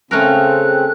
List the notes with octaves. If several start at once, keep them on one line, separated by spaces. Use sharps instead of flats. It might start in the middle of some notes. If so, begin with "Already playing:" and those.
C#3 A3 C4 C#4 A#4 F#6